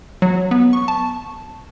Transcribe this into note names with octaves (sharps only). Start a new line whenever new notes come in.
F#3
B3
C#6
A5